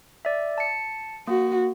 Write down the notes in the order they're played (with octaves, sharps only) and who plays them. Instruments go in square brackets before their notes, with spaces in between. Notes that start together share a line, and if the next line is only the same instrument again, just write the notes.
[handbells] D5 E5
A5 C#7
[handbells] A#3 [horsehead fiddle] F#4